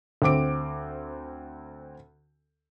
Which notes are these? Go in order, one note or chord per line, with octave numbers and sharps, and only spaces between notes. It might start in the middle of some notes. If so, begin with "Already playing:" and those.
D2 C4 D6 D7